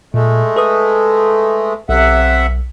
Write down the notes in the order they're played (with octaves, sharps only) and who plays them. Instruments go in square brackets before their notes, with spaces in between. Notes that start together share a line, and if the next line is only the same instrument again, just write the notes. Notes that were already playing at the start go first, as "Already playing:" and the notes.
[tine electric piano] A#2 [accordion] G#3 A3
[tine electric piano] A4 B4 D#6
[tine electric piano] B1 [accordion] C3 E5 F#5